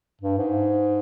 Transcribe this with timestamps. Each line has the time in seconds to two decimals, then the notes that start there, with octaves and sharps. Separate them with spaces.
0.21 G2
0.38 G#2